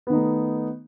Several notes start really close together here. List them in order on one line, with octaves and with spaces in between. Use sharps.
B3 D#3 D#4 A3